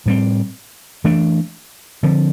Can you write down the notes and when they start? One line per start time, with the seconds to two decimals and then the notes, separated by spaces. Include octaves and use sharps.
0.06 A2 G3 C4
1.04 E3 A3 D4
2.03 D3 F3 C4